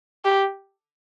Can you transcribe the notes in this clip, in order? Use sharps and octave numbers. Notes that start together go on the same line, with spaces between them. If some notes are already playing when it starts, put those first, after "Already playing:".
G4